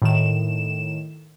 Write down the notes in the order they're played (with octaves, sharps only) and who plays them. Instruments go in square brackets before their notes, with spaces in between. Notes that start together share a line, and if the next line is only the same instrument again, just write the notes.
[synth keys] A2 D#3 E7